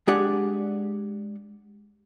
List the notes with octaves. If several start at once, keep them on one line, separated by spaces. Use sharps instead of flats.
G#3 D4 G4 G#4 D5 F#5